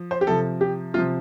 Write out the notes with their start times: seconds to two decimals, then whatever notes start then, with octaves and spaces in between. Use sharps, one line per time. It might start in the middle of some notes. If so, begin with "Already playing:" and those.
Already playing: F3
0.11 C5
0.21 G4
0.27 C3 F3 A4
0.61 G4
0.94 C3 F3 F4